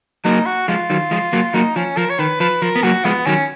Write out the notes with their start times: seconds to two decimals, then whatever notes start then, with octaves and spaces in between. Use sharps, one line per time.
0.25 F#3 A#3 D#4
0.46 F#4
0.68 F3 G#3 F4
0.90 D#3 F#3
1.11 F3 G#3
1.33 F#3 A#3
1.54 F#3 A#3 D#4
1.76 F3 C#4
1.97 F3 A#4
2.09 C#5
2.19 D#3 B4
2.40 F3 B4
2.62 F3 A#4
2.76 B3
2.83 F#3 A#3 F#4
3.05 F3 G#3 B3
3.26 D#3 F#3 C#4